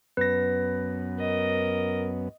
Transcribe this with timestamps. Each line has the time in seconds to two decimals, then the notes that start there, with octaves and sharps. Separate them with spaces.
0.17 F#2 B3 B4 A#6
1.20 A#4 D#5